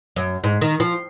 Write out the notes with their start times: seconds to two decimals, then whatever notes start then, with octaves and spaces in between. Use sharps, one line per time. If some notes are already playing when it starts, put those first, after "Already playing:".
0.16 F#2
0.44 G#2
0.61 D#3
0.80 F3